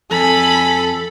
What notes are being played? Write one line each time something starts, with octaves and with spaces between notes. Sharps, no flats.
F2 A4 G#5 B5